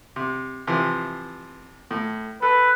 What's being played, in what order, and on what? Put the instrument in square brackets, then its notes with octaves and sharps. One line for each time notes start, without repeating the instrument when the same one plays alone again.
[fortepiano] C3
C3 E3 F3
A2
[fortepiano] A4 [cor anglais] B4